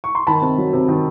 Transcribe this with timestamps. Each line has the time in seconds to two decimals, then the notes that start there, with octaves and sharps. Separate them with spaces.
0.04 C#6
0.15 C6
0.27 D#3 A5 B5
0.42 C3
0.58 F#3
0.73 C3
0.88 D#3